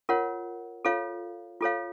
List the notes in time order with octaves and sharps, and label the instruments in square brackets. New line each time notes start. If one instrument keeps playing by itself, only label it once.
[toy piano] F4 A#4 C#5 F#5
F4 A4 C#5 F5
F4 A4 C#5 F5